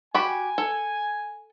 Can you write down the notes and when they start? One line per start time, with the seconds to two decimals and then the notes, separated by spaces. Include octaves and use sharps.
0.14 F#4 G4 G#5 B5
0.58 A4